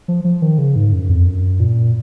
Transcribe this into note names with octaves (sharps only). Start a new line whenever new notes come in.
F3
F3
D#3
C#3
G#2
F#2
F2
F#2
A#2